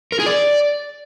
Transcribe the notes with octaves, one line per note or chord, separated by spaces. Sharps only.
A#4
G#4
D5